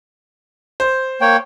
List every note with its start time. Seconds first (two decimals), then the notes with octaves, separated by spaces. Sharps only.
0.80 C5
1.21 A#3 C#5 G5